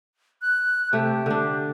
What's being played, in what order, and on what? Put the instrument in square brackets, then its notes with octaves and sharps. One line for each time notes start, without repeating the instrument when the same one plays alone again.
[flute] F#6
[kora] C3 A3 [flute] G4
[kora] D3 D4